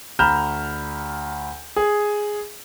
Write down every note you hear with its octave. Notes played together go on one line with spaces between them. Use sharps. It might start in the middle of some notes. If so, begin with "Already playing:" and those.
D2 A#5 B5 F6 G6 E7
G#4